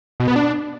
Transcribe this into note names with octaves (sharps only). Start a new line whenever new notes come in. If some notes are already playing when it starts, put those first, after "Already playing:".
B2
B3
D4